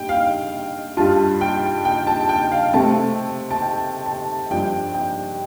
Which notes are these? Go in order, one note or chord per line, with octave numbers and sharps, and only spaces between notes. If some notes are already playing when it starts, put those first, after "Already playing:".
Already playing: G2 G5
F5
G2 G3 F4 A5
G5
G5
A5
G5
F5
C3 A3 C4 A5
A5
G5
A5
G2 F3 D4 G5
G5